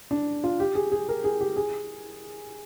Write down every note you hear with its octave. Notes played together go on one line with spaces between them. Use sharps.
D4
F4
G4
G#4
G#4
A#4
G#4
G4
G#4